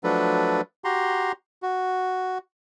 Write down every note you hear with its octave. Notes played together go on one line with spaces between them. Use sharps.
F3 F#3 A3 D4 A4 B4
F#4 G4 A#5 C6
F#4